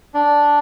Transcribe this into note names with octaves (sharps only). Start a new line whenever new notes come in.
D4